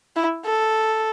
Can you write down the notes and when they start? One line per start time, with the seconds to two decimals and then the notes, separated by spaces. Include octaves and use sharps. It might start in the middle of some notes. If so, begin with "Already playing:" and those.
0.16 E4
0.46 A4